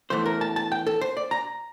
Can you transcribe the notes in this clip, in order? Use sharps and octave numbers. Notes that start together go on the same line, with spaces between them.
E2 E3 A3 C5
A#4
A5
A5
G5
A4
C5
D5
A#5